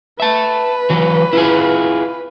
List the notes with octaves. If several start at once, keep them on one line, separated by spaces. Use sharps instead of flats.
B4 E5 A5
E3 F#3
E4 F4 G#4